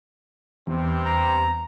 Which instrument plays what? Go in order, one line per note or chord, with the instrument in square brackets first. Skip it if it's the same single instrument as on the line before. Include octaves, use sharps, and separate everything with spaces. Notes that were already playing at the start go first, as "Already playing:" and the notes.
[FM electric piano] E2 [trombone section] G2 C3 C4
[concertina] A#5